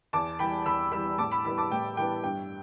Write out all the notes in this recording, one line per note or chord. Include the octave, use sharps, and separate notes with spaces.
E2 A5 D6
E3 G3 G5 B5
E2 B5 E6
E3 G3 B5 E6
A2 A5 D6
B5 E6
E3 G3 B3 B5 E6
A5 D6
A2 G5
E3 G3 B3 G5
G2 G5